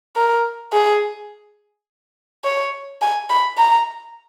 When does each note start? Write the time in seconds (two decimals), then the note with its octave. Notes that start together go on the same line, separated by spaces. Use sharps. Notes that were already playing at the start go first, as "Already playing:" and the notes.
0.16 A#4
0.73 G#4
2.44 C#5
3.02 G#5
3.30 B5
3.58 A#5